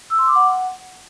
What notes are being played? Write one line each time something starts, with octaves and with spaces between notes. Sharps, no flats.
E6
C6
D6
F#5